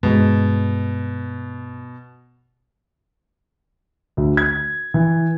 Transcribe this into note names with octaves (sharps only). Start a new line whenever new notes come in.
G2 B2 G#3
D2
G#6
E3